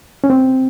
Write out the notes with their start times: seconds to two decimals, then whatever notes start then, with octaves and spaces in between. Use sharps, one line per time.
0.24 C#4
0.30 C4